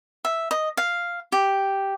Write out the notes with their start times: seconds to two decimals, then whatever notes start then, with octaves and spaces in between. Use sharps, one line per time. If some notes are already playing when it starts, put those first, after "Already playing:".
0.25 E5
0.51 D#5
0.77 F5
1.32 G4